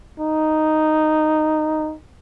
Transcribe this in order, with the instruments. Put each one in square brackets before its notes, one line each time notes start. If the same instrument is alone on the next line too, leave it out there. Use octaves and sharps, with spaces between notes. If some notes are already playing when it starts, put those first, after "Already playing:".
[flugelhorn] D#4